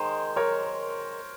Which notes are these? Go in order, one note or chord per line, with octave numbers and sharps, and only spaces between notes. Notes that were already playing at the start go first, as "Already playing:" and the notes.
Already playing: D#3 G#3 C5
A#4 C#5